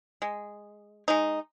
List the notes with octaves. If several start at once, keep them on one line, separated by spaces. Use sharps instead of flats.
G#3
G#3 D#4